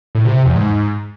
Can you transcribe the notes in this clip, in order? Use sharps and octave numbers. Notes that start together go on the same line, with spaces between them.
A2
C3
C3
E2
G#2